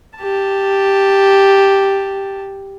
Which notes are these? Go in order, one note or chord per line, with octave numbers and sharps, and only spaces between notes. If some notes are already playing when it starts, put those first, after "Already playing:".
G4 A5